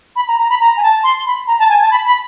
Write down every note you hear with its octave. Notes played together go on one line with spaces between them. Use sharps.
B5
A#5
A#5
B5
A#5
G#5
A5
C6
B5
A#5
A5
G#5
A5
B5
B5